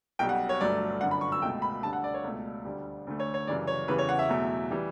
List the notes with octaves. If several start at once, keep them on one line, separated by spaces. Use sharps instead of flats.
B1 B2 G3 G5
F#5
C#5
G1 G2 F#3 A3 D5
G1 F#2 D3 F#5
B5
C#6
E6
C#2 B2 A3 G5
B5
D2 D3 G3 A5
F#5
D5
C#5
C#2 B2 A3
D2 D3 G3
D2 D3 A3
C#5
C#5
F#2 C#3 E3 G3 D5
C#5
E2 C#3 E3 G3 B4
C#5
F#5
E5
E2 B2 F#3 A3
E3 G3